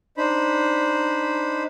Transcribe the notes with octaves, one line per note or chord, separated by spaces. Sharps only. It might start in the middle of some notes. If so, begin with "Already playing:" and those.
D4 D#4 C5 B5